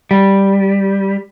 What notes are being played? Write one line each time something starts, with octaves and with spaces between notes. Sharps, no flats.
G3